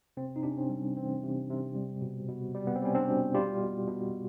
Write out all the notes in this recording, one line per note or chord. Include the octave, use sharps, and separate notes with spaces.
C3 C4
D#4
C3 D4
C#4
C4
G3
E3 C4
C3
C3
G3
B2
B2
G3
B3
C4
G3 C#4
C4 D4
B2
G3 F4 G4
B2
B2